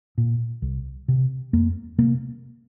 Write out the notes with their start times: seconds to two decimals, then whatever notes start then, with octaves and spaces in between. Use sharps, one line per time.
0.18 A#2
0.62 C2
1.08 C3
1.53 F2 A#3
1.98 C3 A#3